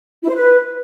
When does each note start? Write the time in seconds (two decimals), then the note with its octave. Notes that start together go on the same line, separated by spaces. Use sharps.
0.22 E4
0.29 C5
0.35 B4